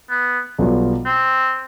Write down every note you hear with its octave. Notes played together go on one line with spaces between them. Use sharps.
B3
B1 B2 G3 B3 F4
C4